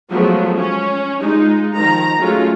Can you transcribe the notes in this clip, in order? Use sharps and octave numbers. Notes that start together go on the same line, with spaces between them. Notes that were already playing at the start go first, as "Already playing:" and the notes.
F3 F#3 G#3 A3 B3
C#4
G#3 D#4 F4
D#3 F3 A#5
F#3 G#3 A3 C#4 F4 F#4